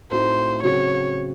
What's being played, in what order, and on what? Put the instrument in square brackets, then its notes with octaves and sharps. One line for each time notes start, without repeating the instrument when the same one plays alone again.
[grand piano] A2 A3 C4 D#4 F#4 [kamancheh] C5
[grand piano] C#3 F#3 C4 F#4 [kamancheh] C#5